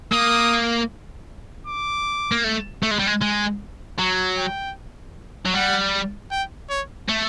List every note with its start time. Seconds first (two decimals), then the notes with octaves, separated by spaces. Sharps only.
0.12 A#3 D#6
1.67 D6
2.32 A#3
2.44 A3
2.83 A3
2.91 G#3
2.99 G3
3.07 G#3
3.22 G#3
3.99 F#3 C#6
4.38 G5
5.46 F#3
5.54 G3 F#5
6.31 G5
6.70 C#5
7.09 A3